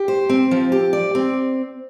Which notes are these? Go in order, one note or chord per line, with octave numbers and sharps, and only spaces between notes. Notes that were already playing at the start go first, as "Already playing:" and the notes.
Already playing: G4
C5
C4
F3
G4
D5
C4